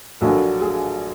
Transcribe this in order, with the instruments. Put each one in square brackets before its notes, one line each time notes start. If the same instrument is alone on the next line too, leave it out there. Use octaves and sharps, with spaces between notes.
[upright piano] A#1 A#2 F#3 A#3 D4 A4
G#4